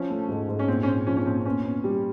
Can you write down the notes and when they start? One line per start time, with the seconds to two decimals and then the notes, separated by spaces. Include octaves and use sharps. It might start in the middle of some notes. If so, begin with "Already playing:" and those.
Already playing: F3 C#4
0.10 A3
0.29 G#2
0.49 G#2
0.59 C#4
0.67 A#2 C4
0.83 C#4
0.87 A#2 C4
1.07 F3 C#4
1.17 C#4
1.26 A#2 C4
1.45 B3 C#4
1.65 B3
1.84 G3